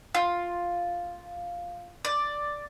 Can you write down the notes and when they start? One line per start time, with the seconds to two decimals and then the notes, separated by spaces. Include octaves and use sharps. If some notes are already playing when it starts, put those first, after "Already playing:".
0.15 F4
2.05 D5